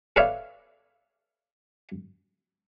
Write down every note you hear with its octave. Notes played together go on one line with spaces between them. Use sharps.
A4 B4 C#5 D5 E5 F5